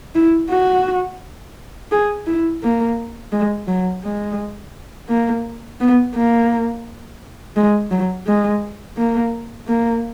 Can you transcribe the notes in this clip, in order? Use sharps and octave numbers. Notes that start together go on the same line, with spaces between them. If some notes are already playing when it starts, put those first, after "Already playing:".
E4
F#4
G#4
E4
A#3
G#3
F#3
G#3
A#3
B3
A#3
G#3
F#3
G#3
A#3
A#3